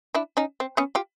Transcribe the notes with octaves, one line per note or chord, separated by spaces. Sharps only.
D4 E4
C#4 D#4
C4
B3 C#4
F4 G4